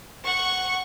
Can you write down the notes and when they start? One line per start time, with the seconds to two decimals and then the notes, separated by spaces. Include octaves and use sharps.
0.24 F#5 C#6